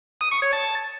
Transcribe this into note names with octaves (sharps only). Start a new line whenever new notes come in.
D#6
C#6
C#5
A5